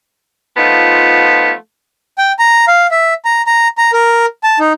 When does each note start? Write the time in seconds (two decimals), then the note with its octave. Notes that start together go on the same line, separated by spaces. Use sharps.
0.57 F3 A3 B3 D#4 F4
2.18 G5
2.39 A#5
2.68 F5
2.91 E5
3.25 A#5
3.47 A#5
3.78 A#5
3.93 A#4
4.43 A5
4.60 D#4